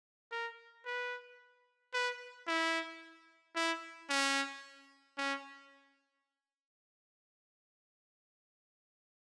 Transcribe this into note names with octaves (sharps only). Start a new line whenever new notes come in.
A#4
B4
B4
E4
E4
C#4
C#4